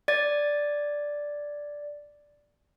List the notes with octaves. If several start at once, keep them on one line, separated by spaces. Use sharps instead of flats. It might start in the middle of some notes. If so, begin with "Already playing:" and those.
D5 A6